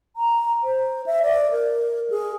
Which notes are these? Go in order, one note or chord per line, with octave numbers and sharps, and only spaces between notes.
A#5
C5
E5
D5
A#4
G#4